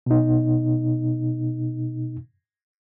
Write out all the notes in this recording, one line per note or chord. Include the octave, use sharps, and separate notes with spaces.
B2 D#4